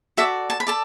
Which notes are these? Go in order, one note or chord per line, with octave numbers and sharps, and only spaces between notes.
F#4 A4 D5 E5
A5
B5
A4 D5 A5